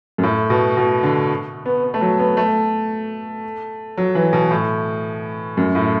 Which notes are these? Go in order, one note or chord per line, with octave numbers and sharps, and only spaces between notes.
F#2
A2
B2
B2
D3
B3
B3
A3
F#3
B3
A3
F#3
E3
B2
A2
F#2
A2